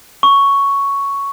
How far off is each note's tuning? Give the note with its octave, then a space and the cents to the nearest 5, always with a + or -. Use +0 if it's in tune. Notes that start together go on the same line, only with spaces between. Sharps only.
C#6 +5